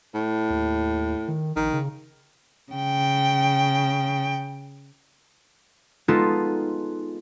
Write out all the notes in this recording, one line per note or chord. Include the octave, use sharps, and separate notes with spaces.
A2
D#2
D#3
A#1 D#3
C#3
C#3 G5
G#3 B3 D#4 F4 A4